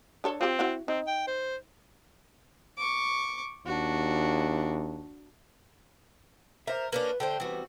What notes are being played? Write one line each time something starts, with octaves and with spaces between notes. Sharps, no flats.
D4 A4 C#5
C4 F4 G4
E4 F#4 F#5
C4 D#4
G5
C5
C#6 D6
D#2 D4 F#4
A#4 C5 E5
A#3 C#4 D4 B4
D3 A3 C5 G5
E3 G3 B3 C4 F#4